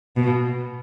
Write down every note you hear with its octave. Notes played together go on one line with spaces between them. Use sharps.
B2